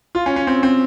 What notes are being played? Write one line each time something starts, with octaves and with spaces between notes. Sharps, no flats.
F4
C#4
C#4
C4
C4